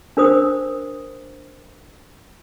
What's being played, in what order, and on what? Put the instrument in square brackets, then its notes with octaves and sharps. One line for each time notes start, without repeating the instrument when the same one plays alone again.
[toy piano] D4 A#4 C5 D#6